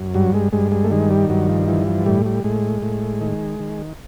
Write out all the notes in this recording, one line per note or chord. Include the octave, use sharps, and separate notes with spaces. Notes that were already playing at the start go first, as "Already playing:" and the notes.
Already playing: F#2
G2 F#3
G#3
G2 G#3
G#3
A3
D#3 G#3
G3
G2 F#3
F3
E3 F3
F3
A2 G3
G3
A2 G#3
A2
D#3
D#3